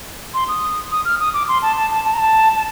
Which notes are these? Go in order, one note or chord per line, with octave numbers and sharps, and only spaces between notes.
C6
D#6
D#6
F6
D#6
D6
C6
A5
A5
A5
A5
A#5
A5
A5